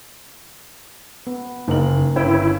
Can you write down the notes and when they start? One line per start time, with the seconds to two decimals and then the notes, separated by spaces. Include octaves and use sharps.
1.27 B3
1.68 F#1 A#3 D#4 A#4 F#7
2.16 G1 C#4 E4 G5